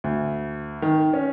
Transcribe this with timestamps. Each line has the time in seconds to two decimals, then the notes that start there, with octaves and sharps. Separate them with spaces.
0.04 D2
0.82 D#3
1.14 C#4